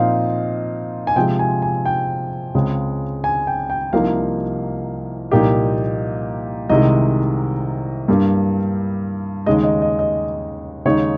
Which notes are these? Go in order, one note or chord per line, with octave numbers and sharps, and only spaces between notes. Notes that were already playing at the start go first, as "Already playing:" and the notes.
Already playing: A#2 F3 C4 D#4 F5
G#5
C3 F3 G#3 G5
G#5
G#5
G5
C#2 C#3 G#3 C4
G#5
G5
G5
C2 C3 F3 A#3 D#4 F5
C2 A#2 F3 A#3 D#4 G4
C2 C3 D#3 G#3 D#5
G2 G3 A#3
D#2 C#3 G#3 D#4 D#5
D#5
D#5
D#5
D#2 C#3 G#3 D#4 C#5